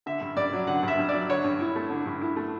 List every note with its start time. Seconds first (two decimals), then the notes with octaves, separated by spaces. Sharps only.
0.06 D3 E5
0.21 G2
0.37 G2 D5
0.53 F#3
0.67 D3 F#5
0.83 G2 E5
0.99 G2
1.09 D5
1.14 F#3
1.29 D3 C#5
1.44 G2
1.60 E4
1.76 A3
1.90 D3
2.06 G2
2.22 E4
2.37 A3